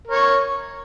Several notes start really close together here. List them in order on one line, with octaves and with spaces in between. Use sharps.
A#4 C#5 C#6